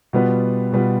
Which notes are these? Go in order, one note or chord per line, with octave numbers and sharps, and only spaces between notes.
B2 G3 B3 F4 B4
B2 G3 B3 F4 B4